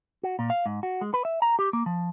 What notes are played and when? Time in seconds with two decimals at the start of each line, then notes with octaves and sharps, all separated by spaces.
0.23 F#4
0.39 A#2
0.50 F5
0.66 G#2
0.83 F#4
1.01 G#3
1.14 B4
1.25 E5
1.42 A#5
1.59 G4
1.73 A#3
1.86 F3